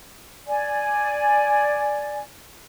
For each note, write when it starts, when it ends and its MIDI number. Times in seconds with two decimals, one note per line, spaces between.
0.47 2.22 74
0.47 2.22 80